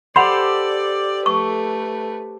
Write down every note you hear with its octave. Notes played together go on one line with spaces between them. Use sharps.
G4 A4 C5 D5 F#5 B5 C6
A3 B4 C#6